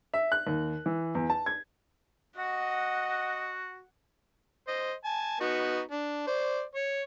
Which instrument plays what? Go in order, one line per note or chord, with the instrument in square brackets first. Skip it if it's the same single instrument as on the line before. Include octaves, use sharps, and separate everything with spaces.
[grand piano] E5
F#6
D#2
E3
E2
A5
G#6
[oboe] F#4 [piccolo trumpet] D#5 [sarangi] F#5
[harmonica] C5 D#5
G#5 A5
B3 D#4 F#4
D4
C5 D5
C#5